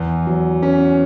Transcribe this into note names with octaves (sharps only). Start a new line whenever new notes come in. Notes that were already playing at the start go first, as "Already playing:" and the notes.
Already playing: E2
F#3
C#4